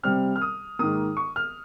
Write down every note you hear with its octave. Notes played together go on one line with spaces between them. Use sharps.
C3 G3 C4 F6
F6
D#6
G#2 D#3 A#3 D#6
C#6
F6